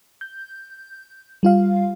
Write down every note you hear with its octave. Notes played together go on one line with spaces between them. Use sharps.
G6
G3 F4 F5